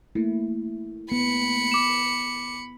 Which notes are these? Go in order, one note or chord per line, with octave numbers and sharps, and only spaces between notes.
A3 A#3 E4
B3 B5 C#7
D6 E7